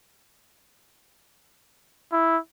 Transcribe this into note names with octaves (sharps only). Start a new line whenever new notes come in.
E4